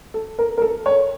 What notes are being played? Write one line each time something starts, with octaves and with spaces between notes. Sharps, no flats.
A4
A#4
A#4
A4
C#5